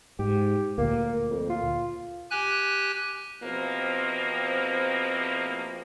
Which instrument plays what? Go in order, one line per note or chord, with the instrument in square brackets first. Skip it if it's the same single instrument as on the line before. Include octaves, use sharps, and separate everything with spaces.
[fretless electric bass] G#2 [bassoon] G4
[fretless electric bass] D2 A#2 [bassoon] A#3
[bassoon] F2
F4
[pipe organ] G4 G#5 F#6
[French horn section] E2 B2 F3 A#3 C4